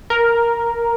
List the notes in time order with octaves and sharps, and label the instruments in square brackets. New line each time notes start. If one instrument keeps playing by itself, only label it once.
[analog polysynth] A#4